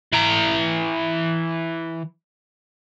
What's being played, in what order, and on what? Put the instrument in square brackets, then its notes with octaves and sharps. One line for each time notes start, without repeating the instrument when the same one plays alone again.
[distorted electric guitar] E3 A#5